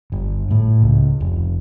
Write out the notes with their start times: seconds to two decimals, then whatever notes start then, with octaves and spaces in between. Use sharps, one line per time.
0.12 G1
0.51 A2
0.82 C#2
1.20 F1